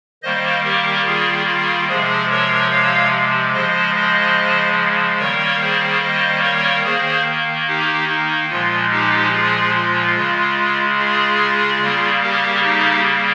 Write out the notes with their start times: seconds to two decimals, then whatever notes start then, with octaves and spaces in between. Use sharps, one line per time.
0.23 D#3 G3 A#3 C5 D#5
0.64 G4 A#4
1.05 F4 G#4
1.47 F4 G#4
1.88 C3 F3 G#3 G#4 C5
2.29 A#4 C#5
2.71 C#5 F5
3.53 C#3 F3 G#3 C5 D#5
3.95 C5 D#5
5.19 D#3 G3 A#3 A#4 C#5
5.61 G#4 C5
6.02 C5 D#5
6.43 A#4 C#5
6.84 D#3 A#3 G#4 C5
7.67 D#4 G4
8.08 D#4
8.49 A#2 F3 G#3 F4
8.91 D#4 G4
9.33 F4 G#4
9.74 F4
10.16 C#3 G#3
10.98 F4 G#4
11.81 C#3 G3 A#3
12.22 G4 A#4
12.64 D#4 G4